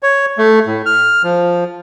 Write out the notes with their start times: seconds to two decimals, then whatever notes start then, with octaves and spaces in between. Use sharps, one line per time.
0.03 C#5
0.38 A3
0.67 A2
0.86 F6
1.23 F3